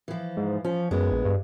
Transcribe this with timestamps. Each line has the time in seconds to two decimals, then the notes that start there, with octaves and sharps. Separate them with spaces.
0.08 E3 F3
0.37 G#2
0.64 F3 C#4
0.91 F#2 G#3 B3
1.11 A#1
1.25 G2